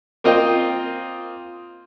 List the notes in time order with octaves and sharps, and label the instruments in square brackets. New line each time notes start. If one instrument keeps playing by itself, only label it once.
[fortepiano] A#3 C4 F4 D#5 G5